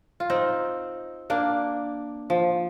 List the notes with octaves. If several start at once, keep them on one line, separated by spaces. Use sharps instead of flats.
F4
C4 D#4
A#3 D4
F3